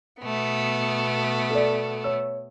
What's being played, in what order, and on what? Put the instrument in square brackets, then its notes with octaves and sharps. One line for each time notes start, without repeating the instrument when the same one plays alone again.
[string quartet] B2 A3 B3
[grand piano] A4 D5
C#5 E6